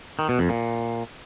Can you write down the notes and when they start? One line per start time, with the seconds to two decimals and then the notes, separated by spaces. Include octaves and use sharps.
0.19 D#3
0.29 B2
0.39 F2
0.49 A#2